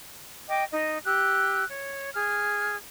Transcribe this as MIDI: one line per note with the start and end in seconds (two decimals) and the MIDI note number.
0.48 0.63 75
0.48 0.63 79
0.48 0.63 86
0.71 0.97 63
0.71 0.97 75
1.05 1.64 67
1.05 1.64 88
1.05 1.64 90
1.67 2.09 73
2.14 2.75 68
2.14 2.75 89